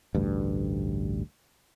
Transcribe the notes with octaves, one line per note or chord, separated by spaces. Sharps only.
A1 D2 G2